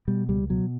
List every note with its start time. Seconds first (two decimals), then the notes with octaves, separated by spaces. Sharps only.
0.08 B2 G3
0.28 C#2 G3
0.50 B2 F#3